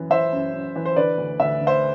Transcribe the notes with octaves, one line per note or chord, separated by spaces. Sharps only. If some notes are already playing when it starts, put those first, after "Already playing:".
Already playing: F#2 E3
E3 C5 E5
F#2
F#2
E3
C5
D3 B4 D5
D2
D2 E5
D3
C5 E5